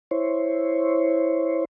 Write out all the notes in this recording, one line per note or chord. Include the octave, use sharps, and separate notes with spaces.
E4 C5 C#5